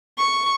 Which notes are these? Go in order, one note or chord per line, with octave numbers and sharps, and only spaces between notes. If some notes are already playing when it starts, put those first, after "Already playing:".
C#6